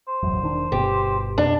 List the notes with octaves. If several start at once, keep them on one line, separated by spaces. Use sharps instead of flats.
C5
E1 A1 F#2
E1 D#3 D4
G1 B2 G4
F2 B2 D4